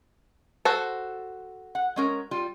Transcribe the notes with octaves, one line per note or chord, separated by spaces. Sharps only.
F#4 A4 C5
F#5
G#3 C#4 A#4
G3 F4